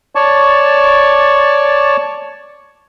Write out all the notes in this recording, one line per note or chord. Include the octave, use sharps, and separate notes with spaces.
C#5 D5 A5 C#6